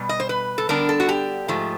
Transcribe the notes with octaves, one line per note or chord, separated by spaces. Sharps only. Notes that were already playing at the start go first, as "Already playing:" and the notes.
Already playing: B2 G3
D#5
C5
B4
A4
D3 G3 B3 D4 A#4
A4
F#4
G4
G#2 F3 A3